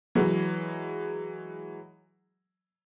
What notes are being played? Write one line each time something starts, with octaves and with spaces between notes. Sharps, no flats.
E3 F#3 G#3